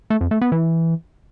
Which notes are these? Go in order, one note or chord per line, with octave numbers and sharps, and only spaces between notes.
A3
F2
A3
B3
E3